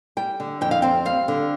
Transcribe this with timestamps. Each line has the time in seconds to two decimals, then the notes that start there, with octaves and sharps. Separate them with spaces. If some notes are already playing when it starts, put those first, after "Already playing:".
0.17 G3 G5
0.40 D3
0.61 F2 G5
0.71 F5
0.82 C4 G5
1.05 G3 F5
1.28 D3